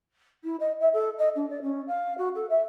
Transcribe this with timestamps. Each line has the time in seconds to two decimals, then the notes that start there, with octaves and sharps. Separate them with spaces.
0.44 E4
0.60 D#5
0.80 E5
0.93 A4
1.18 D#5
1.35 D4
1.50 D5
1.62 C#4
1.88 F5
2.18 F#4
2.35 A4
2.50 E5